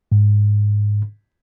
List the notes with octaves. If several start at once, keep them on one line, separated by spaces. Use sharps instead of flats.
G#2